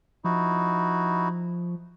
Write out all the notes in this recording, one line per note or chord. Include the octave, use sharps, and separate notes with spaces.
F3 D#4 E4 F#4